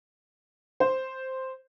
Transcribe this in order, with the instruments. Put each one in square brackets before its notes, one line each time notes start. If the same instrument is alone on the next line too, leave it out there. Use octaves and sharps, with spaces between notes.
[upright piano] C5